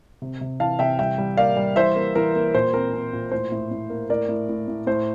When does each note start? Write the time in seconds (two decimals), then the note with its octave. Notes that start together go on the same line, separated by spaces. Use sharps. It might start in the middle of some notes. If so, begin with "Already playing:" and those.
0.22 C3
0.41 C3
0.60 E3 F5 A5
0.79 C3 E5 G5
0.99 G3 E5 G5
1.18 G3
1.37 A#3 D5 F5
1.57 G3
1.76 E3 C5 E5
1.96 A#3
2.15 E3 A#4
2.35 A#3
2.54 A#2 C5
2.74 C4 A#4
2.94 C4
3.13 A#2
3.32 A2 C5
3.52 A2
3.71 A2
3.90 A#3
4.10 A2 A#4 D5
4.29 A2
4.49 A2
4.68 A2
4.87 A2 C5